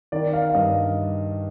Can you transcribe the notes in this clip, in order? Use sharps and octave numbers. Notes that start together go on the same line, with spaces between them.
D#3 D5
F5
F5
G2 D#5